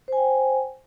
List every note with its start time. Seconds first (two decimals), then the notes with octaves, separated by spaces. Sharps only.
0.08 C5
0.13 G#5
0.17 G5